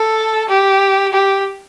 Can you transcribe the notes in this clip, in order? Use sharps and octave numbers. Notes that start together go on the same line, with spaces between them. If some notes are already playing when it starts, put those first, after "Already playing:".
Already playing: A4
G4
G4